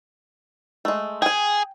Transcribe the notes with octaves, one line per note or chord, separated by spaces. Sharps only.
G#3 A3
G#4 G5 G#5